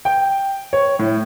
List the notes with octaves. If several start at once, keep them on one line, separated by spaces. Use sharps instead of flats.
G5
C#5
A2